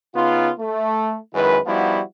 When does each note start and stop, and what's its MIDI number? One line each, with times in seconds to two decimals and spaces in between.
0.15 0.51 49
0.15 0.51 59
0.15 0.51 63
0.15 0.51 65
0.59 1.16 57
1.34 1.58 42
1.34 1.58 51
1.34 1.58 56
1.34 1.58 64
1.34 1.58 71
1.66 2.01 53
1.66 2.01 55
1.66 2.01 59
1.66 2.01 63
1.66 2.01 64
1.66 2.01 66